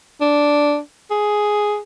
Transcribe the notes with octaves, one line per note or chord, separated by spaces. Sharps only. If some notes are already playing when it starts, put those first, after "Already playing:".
D4
G#4